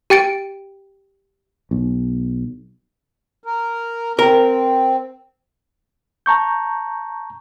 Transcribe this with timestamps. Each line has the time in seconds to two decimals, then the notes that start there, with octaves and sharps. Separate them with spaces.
0.10 G4 G5 A6 D7
1.71 B1
3.44 A#4
4.19 C4 A#4
6.26 A5 A#5 C#6 G6